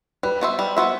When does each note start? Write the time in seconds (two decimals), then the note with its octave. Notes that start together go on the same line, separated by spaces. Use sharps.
0.23 G3 B4
0.41 B3 F#4 C5 E5
0.59 G3
0.77 B3 F#4 C5 E5